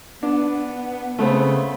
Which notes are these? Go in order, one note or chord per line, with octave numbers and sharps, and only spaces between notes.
B3 D4
C#3 A3 B3 C4